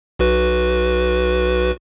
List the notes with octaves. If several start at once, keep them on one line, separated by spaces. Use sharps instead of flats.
B1 F#4 B4